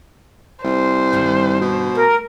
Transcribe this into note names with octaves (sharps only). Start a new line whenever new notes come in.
C2 C5
G2 D3 D#3
B2
A3 A#4